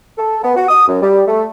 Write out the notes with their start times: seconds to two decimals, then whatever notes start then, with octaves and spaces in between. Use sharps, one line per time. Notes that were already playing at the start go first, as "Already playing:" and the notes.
0.18 A4
0.43 B3
0.56 F#4
0.69 D#6
0.87 F#2
1.02 G3
1.28 A3